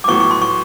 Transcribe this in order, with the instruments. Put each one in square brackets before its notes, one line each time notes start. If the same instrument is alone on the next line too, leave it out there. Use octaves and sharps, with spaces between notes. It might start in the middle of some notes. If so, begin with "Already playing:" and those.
[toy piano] D6
[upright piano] A2 F#3 B3 [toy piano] C#6
[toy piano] C#6
C6
C#6